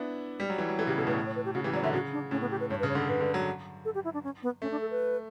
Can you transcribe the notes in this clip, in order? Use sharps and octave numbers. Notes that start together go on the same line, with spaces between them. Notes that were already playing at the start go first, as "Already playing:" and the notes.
Already playing: B3 D4 E4
G3
F#3
E3
F#3
E3 A4
C#3 G4
B2 A4
A2 B4
C#5
B4
G4
C#3 F#4
E3 G4
F#3 D5
D3 E5
C#3 F#4
D4
A2 C#4
B3
G4
B4
G2 C#5
B4
C#3
C#5
D3 A4
C#3 B4
D3
F#3
A4
G4
E4
D4
C#4
B3
A3 C#4
D4
A4
B4